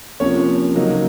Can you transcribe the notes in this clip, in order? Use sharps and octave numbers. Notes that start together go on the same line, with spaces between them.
C3 F3 A#3 C#4 C#5
C#3 F#3 A#3 D#4